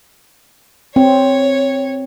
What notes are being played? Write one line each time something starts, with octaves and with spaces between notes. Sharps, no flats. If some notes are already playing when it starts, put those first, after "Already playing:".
C4 C#5